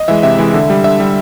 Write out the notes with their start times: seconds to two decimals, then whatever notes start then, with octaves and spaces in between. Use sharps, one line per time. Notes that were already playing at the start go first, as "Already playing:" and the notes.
Already playing: D#5
0.08 E3 G#3 E5
0.23 C3 E5
0.38 E3 G#3
0.54 D3
0.70 G3
0.84 D3 E5
1.00 G3